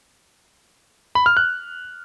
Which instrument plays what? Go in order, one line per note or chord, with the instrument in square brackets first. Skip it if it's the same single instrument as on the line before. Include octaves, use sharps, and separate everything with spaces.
[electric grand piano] B5
F6
F#6